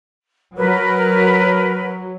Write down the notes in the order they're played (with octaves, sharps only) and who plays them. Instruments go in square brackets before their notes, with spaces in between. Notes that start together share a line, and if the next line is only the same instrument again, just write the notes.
[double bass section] F#3 [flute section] A#4 B4